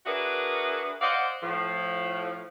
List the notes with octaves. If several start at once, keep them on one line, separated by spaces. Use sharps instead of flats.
D4 F#4 G#4 A#4 B4 E5
C5 D5 D#5 F5 F#5
A2 F3